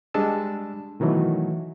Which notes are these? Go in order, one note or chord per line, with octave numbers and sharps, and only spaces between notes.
G3 G#3 D4 A5 E6
B2 D#3 E3 F#3 A3